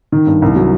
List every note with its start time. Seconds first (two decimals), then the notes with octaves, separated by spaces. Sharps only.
0.12 D#3
0.27 G2
0.42 C2
0.56 F#3